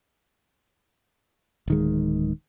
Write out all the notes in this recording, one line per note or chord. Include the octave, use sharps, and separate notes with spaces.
D1 D#3 G#3